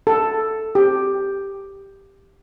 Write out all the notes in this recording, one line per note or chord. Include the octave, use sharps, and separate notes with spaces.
A4
G4